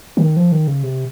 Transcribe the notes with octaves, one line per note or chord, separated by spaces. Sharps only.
C#3
D#3
F3
D#3
C#3
C3